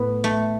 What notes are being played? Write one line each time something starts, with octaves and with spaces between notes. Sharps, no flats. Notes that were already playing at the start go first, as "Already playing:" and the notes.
Already playing: A2 B3
A3